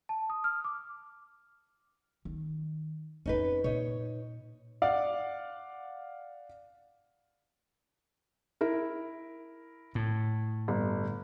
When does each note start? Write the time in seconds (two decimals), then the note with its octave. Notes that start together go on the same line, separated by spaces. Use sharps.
0.09 A5
0.30 D#6
0.44 F6
0.64 D6
2.25 D#3
3.26 F2 B3 C#4 D#4 B4
3.64 A#2 D#4 C#5
4.82 D5 F5 F#5
8.61 E4 A#4
9.95 A2
10.68 G1